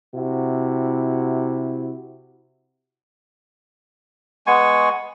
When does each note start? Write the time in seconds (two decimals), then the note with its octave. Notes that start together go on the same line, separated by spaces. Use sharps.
0.15 C3 E4 F#4
4.47 G#3 B3 G#5 C#6